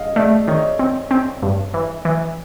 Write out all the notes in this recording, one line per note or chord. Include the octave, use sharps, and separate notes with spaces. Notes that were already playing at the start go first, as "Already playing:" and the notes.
Already playing: D#5 F5
A3 D5 E5
D#3 C#5 D#5
C4
C4
G2
E3
E3